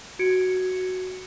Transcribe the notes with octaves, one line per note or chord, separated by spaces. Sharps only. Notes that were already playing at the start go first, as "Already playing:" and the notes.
F#4 G#6 C#7 D7